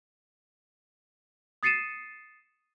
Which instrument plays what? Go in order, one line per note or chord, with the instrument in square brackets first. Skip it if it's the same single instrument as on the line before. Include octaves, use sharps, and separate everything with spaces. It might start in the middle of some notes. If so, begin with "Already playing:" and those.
[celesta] D#6 A6 C7 C#7 D#7 E7